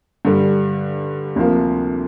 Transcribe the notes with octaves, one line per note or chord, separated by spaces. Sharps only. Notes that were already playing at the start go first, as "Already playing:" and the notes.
G2 D3 G3
D2 C3 F3 A#3